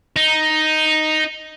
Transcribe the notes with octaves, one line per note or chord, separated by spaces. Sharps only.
D#4